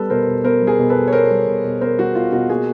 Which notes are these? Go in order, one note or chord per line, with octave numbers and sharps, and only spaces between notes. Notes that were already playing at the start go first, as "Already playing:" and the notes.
Already playing: G3 B3 A4 B4
B2 A#4 C5
B2
B3 A#4 C5
G3
G#4 A#4
B2
A4 B4
B2
C#5
B3 A#4 C5
G3
B2
B2
B3 A#4 C5
G3 F#4
B2 F4
B2 F#4
A#3 F#4 G#4